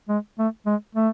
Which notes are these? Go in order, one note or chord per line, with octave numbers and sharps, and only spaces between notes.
G#3
A3
G#3
A3